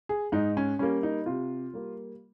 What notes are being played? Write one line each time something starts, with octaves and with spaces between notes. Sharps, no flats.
G#4
G#2 D#4
C#4
G3 A#3 C#4
D#4
C3 F4
G3 A#3